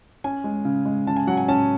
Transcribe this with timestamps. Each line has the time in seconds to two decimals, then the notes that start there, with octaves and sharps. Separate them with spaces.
0.24 C#4 G#5
0.44 G#3
0.65 C#3
0.85 G#3
1.07 C#3 A5
1.17 G#5
1.27 F#3 F#5
1.37 G#5
1.48 C#4 A5